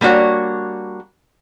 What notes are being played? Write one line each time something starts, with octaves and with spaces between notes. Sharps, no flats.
G3 A#3 D4 F#4 C#5